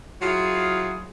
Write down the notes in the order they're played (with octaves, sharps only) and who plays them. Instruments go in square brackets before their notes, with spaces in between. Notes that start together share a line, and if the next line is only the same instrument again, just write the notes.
[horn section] F#3 E4 F4 G#4